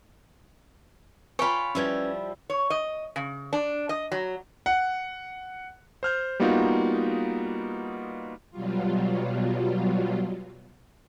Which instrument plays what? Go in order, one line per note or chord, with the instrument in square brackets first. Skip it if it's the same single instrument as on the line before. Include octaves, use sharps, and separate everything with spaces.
[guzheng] F4 G5 [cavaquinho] C#5 B5 [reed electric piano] G#5
[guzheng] F3 G3 E4 [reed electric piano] C#4 B4 G#6
[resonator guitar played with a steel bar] C#5
D#5
C#3
D4
D#5
F#3
[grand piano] F#5
[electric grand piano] C5 F6 G6
G3 A#3 B3 D#4 F4 F#4
[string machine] B2 F#3 G3 F4